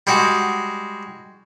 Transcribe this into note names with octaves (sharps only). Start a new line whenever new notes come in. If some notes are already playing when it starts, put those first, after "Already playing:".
G3 G#3 F#4